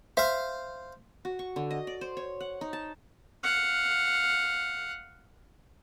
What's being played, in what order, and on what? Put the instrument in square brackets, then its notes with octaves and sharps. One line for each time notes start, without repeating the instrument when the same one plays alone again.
[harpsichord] C5 F5 [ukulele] E5
[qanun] F#4
C#6
D3
D#5
D5
C5
C#5
F#5
D#4
A5
[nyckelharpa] F5 F#5